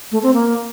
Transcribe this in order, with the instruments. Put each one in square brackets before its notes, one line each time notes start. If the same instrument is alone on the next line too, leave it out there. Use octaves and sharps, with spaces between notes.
[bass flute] A3
C4
A#3